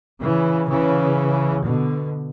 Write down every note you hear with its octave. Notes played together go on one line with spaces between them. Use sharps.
C#3 E3
C#3 E3
B2 D3